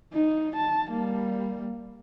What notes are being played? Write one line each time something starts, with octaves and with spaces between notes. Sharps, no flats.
D#4
A5
G3 A#3